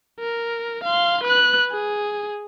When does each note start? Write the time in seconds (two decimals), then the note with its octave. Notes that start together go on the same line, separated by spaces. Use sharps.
0.19 A#4
0.83 F5 C6
1.23 B4 F#6
1.71 G#4